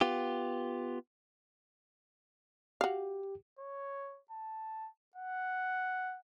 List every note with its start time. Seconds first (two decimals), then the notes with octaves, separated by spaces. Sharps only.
0.01 B3 F4 G4
2.81 F#4 G4 F5
3.59 C#5
4.31 A5
5.16 F#5